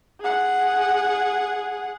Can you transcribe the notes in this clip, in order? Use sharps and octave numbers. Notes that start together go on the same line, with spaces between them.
G#4 F#5